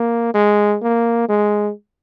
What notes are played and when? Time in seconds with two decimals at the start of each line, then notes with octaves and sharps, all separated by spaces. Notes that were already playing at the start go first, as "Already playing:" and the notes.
Already playing: A#3
0.34 G#3
0.82 A#3
1.29 G#3